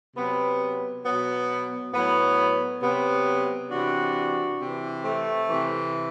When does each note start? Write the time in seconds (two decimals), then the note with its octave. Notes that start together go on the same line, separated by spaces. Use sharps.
0.16 C3 F#3 B3
1.05 B2 F#3 B3
1.94 A2 F#3 B3
2.82 C3 F#3 B3
3.71 C3 E3 D4 F#4
4.60 C3 E3
5.04 A3 C4
5.48 C3 E3